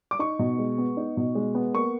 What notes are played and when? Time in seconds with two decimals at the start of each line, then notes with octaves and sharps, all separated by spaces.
0.11 D6
0.19 D#4 C#6
0.39 B2
0.59 G#3
0.78 B3
0.97 D#4
1.17 B2
1.35 G#3
1.55 B3
1.74 A#3 C#6